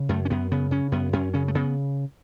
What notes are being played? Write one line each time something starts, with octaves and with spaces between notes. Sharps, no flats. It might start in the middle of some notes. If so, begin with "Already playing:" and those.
Already playing: C#3
F#2 A3
C#4
F#2 B3
C#3 B3
C#3 C#4
F#2 B3
F#2 C#4
C#3 C#4
A3
C#3 B3